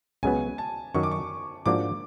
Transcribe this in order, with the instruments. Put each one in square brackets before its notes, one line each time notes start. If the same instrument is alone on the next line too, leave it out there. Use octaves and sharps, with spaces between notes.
[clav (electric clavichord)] C#2 C#3 F#3 B3 [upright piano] G#5
[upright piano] A5
[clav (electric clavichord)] F#2 D#3 F#3 [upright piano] C#6
[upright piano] D6
C#6
[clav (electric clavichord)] G#2 F3 A#3 D4 F#4 [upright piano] D6